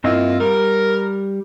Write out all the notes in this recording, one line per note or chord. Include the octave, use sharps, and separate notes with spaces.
G2 A#3 C4 E4 F4 D#5
G3 A#4